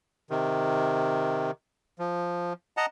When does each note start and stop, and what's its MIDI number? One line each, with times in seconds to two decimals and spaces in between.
0.30 1.51 48
0.30 1.51 51
1.99 2.53 53
2.77 2.86 75
2.77 2.86 78
2.77 2.86 81
2.77 2.86 82